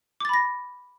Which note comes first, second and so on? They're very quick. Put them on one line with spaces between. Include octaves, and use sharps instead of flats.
D6 A6 B5 A#6